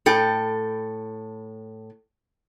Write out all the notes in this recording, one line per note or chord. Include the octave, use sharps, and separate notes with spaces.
A2 A4 G5